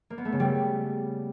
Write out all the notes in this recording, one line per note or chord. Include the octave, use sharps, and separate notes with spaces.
A#3
B3
A3
C#3
G3